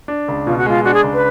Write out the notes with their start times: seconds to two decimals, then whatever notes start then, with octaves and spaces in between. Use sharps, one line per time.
0.08 D4
0.28 C#2
0.46 B2 F4
0.58 F#4
0.66 G#3 F4
0.85 D4 F#4
0.94 G#4
1.04 C#2
1.14 B4